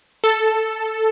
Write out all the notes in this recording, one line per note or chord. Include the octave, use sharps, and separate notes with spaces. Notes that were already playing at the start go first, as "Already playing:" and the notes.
A4